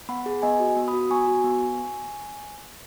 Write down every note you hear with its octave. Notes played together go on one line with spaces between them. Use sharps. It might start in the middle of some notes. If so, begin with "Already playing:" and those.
B3 F#5 B5
G#4
B3 D#5 G#5
F#4
B3
B5 D#6
F#4
B3 G#5 C#6
F#4
B3